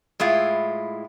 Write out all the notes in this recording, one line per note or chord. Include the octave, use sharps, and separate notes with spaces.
A2 G#3 E4 F4